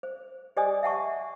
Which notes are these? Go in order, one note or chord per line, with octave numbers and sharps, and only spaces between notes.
C5
G4 C5 D5 D#5 G#5 D#6
E5 F#5 A5 C#6